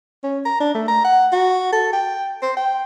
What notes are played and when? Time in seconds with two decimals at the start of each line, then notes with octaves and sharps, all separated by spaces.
0.24 C#4
0.45 A#5
0.60 D4
0.75 A3
0.88 A#5
1.05 F#5
1.32 F#4
1.72 A4
1.93 G5
2.42 C5
2.57 G5